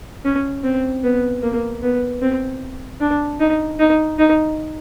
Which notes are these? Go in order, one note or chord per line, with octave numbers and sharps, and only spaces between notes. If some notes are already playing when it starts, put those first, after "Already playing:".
C#4
C4
B3
A#3
B3
C4
D4
D#4
D#4
D#4